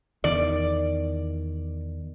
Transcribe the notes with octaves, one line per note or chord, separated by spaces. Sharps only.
E2 D#3 D5